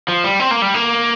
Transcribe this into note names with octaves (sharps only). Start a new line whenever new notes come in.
F3
G3
C4
A#3
G3
A#3